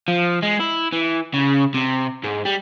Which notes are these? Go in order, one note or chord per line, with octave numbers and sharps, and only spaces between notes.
F3
G#3
E4
E3
C#3
C3
G#2
G3